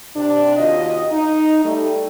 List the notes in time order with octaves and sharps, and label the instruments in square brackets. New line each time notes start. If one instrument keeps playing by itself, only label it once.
[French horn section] C3 D4
D#2 F4 F#4 D#5
D#4
G3 A3